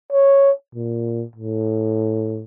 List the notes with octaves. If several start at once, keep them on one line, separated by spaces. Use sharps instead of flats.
C#5
A#2
A2